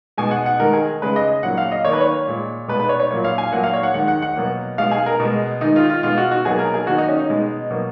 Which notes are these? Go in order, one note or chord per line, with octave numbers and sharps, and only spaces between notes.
B2 G#3 G#5
F#5
F#5
D#3 G#3 A#4
G#4
C#3 G#3 B4
D#5
A#2 F#3 A#3 F#5
F5
D#5
D#3 A#3 C#5
B4
C#5
A#2 G#3
B2 G#3 B4
B4
C#5
C#5
A#2 F#3 A#3 C#5
F5
G#5
A#2 F#3 A#3 F#5
F5
C#5
F#5
D#3 G#3 F#5
F#5
F#5
B2 F#3 A#3
B2 G#3 F5
G#4
A#4
B2
G#3
D#3 G#3 D#4
F4
F4
B2 G#3 F4
F#4
F#4
B2 F#3 A#3 G#4
A#4
G#4
D#3 A#3 F#4
D#4
C#4
D#4
B2 G#3
B2 F#3 A#3